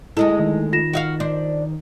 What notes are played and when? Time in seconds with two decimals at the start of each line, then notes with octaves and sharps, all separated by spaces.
0.17 D2 G#3 E4 A4 D#5
0.40 D#3
0.73 F4 A#6 E7
0.93 F#4 E5 F5
1.20 D4 C5